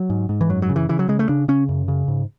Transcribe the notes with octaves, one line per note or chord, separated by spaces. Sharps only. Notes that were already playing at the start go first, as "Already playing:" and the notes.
Already playing: F#3
G#2
G#2
E3
F#2 F#3
F#3
C#3
E3
C#3 E3
F#3
C#3 G#3
A3
C#3 D4
C#3 C#4
F#2
C#3
G#2